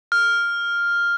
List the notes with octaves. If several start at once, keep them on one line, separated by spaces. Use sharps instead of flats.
F6